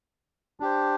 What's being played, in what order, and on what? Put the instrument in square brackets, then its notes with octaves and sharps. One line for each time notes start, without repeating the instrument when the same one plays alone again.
[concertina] D4 G4 C5